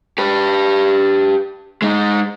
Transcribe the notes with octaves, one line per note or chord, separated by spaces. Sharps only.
G4 B4
G#3 D#4